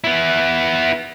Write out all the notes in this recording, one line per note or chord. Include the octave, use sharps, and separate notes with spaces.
B3 E4